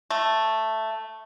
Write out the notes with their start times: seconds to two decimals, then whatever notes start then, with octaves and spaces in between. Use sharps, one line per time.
0.10 A3